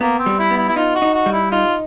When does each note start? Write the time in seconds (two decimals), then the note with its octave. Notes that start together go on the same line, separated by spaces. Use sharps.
0.01 A#3 B3
0.19 C4
0.26 G3
0.39 E4
0.51 B3
0.57 E4
0.68 E4
0.76 D#4 F4
0.95 F#4
1.02 D#4
1.14 F#4
1.26 G3
1.33 E4
1.51 D#4 F4